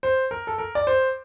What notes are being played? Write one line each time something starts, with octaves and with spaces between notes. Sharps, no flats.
C5
A#4
A4
A#4
D5
C5